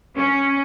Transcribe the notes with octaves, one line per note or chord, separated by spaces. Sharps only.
C#4